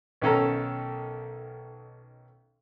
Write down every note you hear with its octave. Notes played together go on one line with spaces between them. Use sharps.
B1 D#3 C#4 A4 A#5